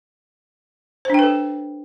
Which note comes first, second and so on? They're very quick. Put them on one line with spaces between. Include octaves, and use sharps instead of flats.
C5 D4 G5 B4 A4